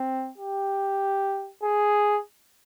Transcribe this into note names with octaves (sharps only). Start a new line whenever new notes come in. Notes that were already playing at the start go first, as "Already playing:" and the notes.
Already playing: C4
G4
G#4